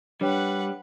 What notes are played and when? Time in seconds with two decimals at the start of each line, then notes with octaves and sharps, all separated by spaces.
0.21 G3 D4 B4 C#5 F#5 G5